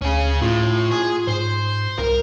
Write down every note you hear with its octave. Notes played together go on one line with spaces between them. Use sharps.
D2 C#4 G#4
A2 F4
G#4
G#2 C5
C2 A#4